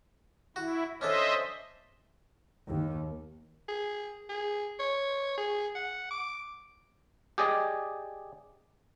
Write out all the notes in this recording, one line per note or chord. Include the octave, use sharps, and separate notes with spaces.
E4 F#4
C#4 D4 A4 C5 D#5 E5
D#2
G#4
G#4
C#5
G#4
F#5
D6
G4 G#4 D5 D#5